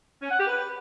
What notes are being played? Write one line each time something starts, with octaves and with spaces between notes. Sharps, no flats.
C#4
F#5
G4
B4